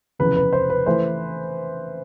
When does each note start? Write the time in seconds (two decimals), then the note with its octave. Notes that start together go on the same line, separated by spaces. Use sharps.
0.19 F1 E2 C#3 B4
0.36 B4
0.53 C5
0.70 B4
0.86 E3 A3 C5